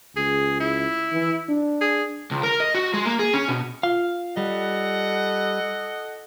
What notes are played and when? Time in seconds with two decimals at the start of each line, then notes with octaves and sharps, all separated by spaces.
0.16 C#2 G#4
0.60 E4
1.12 E3
1.49 D4
1.81 G#4
2.31 C#2
2.43 A#4
2.60 D#5
2.75 F#4
2.94 G#3
3.06 A#3
3.19 G#4
3.34 C#4
3.48 B2
3.83 F4 F5
4.37 G3 A4 D#5 F#5